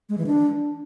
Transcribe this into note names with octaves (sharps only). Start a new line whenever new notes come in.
G#3
E3
D4